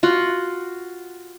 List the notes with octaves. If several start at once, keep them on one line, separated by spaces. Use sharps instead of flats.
F4 F#4 F#5